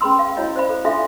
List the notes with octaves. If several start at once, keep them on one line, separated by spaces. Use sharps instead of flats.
C#4 G#4 B4 B5 C6 E6
F5
E4 F#4 C#5 D#5
C5 D5 F5 B5
A4
D4 F4 A4 E5 F5 C6